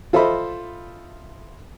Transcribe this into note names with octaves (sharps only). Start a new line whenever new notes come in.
F4 A4 C5 D#5 E5 B5